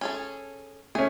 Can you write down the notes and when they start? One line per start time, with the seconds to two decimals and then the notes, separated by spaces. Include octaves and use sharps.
0.01 C#4 G#4 A4
0.95 A3 C#4 G#4